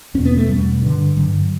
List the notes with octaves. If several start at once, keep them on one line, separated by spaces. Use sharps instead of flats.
E2 B2 C#4
B3
A3
E2 B2 G3
G2 D3
G2 D3 F#3